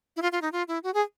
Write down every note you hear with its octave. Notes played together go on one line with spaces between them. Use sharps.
E4
F4
F4
D#4
F4
E4
F#4
G#4